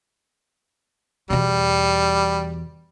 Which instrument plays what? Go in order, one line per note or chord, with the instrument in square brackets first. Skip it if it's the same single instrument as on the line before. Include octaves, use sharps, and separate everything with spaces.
[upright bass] E2 B2 [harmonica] G3